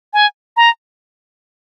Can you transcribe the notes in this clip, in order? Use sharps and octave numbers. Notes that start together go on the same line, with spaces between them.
G#5
A#5